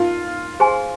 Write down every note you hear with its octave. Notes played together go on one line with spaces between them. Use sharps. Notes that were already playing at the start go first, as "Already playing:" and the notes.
Already playing: D#4 F4 A#4 D#5 C6
G#4 C5 G#5 C6